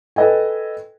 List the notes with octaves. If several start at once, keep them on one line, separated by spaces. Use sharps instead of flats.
A4 B4 D#5 G5 G#5